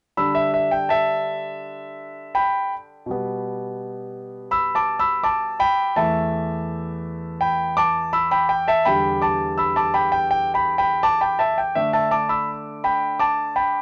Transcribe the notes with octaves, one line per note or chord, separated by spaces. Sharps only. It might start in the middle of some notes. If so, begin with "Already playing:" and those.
D3 G3 D4 B5 E6
E5
E5
G5
E5 A5
G5 B5
B2 G3 B3
B5 E6
A5 D6
B5 E6
A5 D6
G5 B5
E2 E3 A3 E5 A5
G5 B5
A5 D6
B5 E6
G5 B5
G5
E5 A5
E2 D3 G3 G5 B5
A5 D6
B5 E6
A5 D6
G5 B5
G5
G5
G5 B5
G5 B5
A5 D6
G5 B5
E5 A5
G5
D3 A3 D4 E5
E5 A5
A5 D6
B5 E6
G5 B5
A5 D6
G5 B5